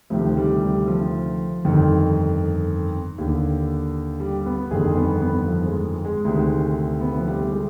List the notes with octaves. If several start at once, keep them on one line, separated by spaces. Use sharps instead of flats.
D2 C3 D#3 F3
G3
G3
F3
G1 F2 D#3
D#2 D3
G3
B3
G1 F2 D#3 G#4
B3
B3
F3
G#3
G#3
D2 C3 D#3
B3
F3
G3
G3
G#3